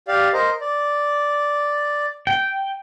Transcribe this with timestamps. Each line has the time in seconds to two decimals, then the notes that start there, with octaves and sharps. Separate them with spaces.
0.08 G4 D5 F5
0.33 A#4 C5 D#5
0.61 D5
2.27 G5